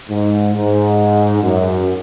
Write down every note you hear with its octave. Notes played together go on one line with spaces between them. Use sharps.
G#2
G#2
F#2